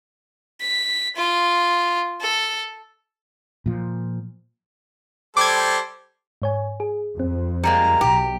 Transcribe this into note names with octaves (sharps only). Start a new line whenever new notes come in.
B6
F4
A4
A#2 F3
G3 A4 C5 D6 G#6
G#2 C#5 G#5
G#4
F2 C4
G3 G#3 A#3 A#5
B1 G4